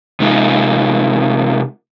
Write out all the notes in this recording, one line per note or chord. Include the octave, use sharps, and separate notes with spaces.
C3 G#3 D#4 F4